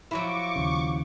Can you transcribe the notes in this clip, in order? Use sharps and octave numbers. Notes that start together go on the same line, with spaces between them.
F3 F#3 E4 C#6 D6
D#2 C#3